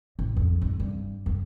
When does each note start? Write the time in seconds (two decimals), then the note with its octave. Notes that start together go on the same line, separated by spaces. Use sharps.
0.19 A1
0.36 F2
0.62 G#2
0.80 G2
1.26 F#2